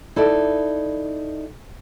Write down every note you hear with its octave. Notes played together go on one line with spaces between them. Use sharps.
D#4 E4 A4 D5